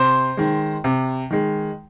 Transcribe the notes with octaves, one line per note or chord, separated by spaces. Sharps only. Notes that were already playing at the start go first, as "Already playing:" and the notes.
Already playing: C3 C5 C6
D#3 G#3
C3
D#3 G#3